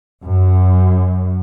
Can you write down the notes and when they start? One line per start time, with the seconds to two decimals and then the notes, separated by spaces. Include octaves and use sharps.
0.23 F#2